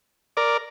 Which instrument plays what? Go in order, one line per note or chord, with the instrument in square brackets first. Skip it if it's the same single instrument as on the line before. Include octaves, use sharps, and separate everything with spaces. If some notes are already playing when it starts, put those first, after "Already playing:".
[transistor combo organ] A#4 D5